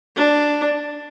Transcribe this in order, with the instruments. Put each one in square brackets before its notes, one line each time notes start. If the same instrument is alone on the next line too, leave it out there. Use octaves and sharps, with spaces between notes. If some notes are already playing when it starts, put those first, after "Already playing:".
[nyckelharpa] D4